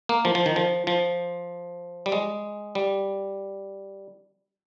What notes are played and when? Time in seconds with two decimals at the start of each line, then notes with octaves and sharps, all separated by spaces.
0.09 A#3
0.25 F3
0.35 F3
0.46 D#3
0.56 F3
0.87 F3
2.06 G3
2.12 G#3
2.75 G3